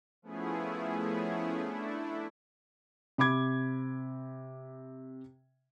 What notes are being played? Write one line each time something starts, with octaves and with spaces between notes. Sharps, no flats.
F3 A3 B3 C#4 E4 G#4
A3 D4 E4
C3 B5 D6 G#6